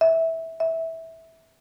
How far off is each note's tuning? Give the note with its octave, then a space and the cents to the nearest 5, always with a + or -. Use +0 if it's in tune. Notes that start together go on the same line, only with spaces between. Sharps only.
E5 -15
E5 -15